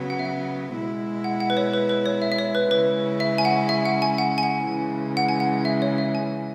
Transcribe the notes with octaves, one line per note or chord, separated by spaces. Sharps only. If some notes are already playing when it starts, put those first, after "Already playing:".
Already playing: C#3 F#3 B3
F#5
E5
F#5
B2 G#3 E4
F#5
F#5
B4
C#5
B4
B4
C#5
E5
E5
C#5
B4
C#3 G#3 C#4 E4 B4
E5
G#5
F#5
E5
F#5
G#5
F#5
G#5
F#5
C#3 E3 G#3
F#5
G#5
F#5
E5
C#5
E5
G#5